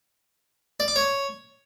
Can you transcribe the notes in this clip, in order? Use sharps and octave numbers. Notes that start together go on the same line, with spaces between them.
D5
D6
C#5